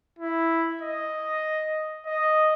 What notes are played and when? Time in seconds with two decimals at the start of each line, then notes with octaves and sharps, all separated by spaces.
0.19 E4
0.82 D#5
2.07 D#5